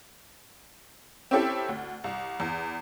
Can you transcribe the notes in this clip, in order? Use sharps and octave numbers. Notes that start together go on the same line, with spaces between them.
C4 C#4 E4 G4 A4
D2
C2
E2